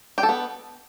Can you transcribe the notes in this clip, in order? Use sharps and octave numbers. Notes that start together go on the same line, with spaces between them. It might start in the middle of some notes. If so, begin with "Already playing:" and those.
G4
A4
B3